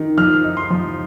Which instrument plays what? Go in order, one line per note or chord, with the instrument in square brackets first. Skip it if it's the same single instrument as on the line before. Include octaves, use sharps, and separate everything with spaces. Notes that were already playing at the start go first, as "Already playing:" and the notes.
Already playing: [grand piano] D#3
F3 F6
D#4
C6
F3